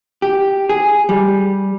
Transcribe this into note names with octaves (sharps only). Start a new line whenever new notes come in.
G4
G#4
G3